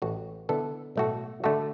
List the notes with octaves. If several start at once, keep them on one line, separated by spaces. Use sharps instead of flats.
A1 A2 A3 F#4
D3 B3 E4 A4
B1 A2 A3 F#4 A4
D3 A3 F#4 A4